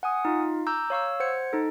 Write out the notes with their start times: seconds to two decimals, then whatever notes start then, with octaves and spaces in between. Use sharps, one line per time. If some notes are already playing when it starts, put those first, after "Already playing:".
0.03 F#5 G#5 D#6
0.25 D#4 F4 F5
0.67 A#5 D6 E6 G6
0.90 C#5 F5 C#6 E6
1.20 C5 F#5 G#6 C#7
1.53 D#4 A4